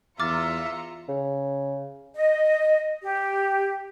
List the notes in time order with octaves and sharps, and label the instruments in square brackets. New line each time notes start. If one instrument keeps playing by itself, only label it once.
[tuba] E2 [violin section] F4 A#5 C#7 [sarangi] E5 [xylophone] D6 F6 A6
[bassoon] C#3
[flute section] D#5
G4